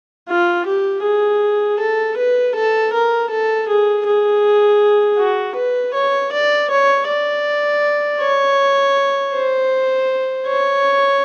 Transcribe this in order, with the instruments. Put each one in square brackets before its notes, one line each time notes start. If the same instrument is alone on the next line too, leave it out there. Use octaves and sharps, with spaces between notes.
[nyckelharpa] F4
G4
G#4
A4
B4
A4
A#4
A4
G#4
G#4
F#4
B4
C#5
D5
C#5
D5
C#5
C5
C#5